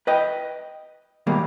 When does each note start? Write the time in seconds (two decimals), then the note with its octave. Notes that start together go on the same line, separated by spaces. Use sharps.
0.07 B4 D#5 G5
1.27 D#2 B2 G3 G#3 A#3